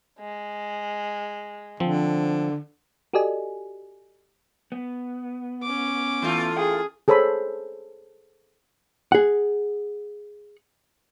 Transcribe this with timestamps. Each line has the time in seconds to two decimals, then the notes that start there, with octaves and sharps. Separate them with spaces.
0.19 G#3
1.80 D3 F3 C4
3.13 F#4 G4 A4 D5 D#5 G#5
4.72 B3
5.63 C#4 D6
6.22 E3 A3 F4
6.56 G#4 F5 G5
7.08 G#4 A4 C5 C#5 B5
9.12 G#4 F#5